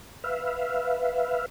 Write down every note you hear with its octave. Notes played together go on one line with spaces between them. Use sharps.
B4 E5 F5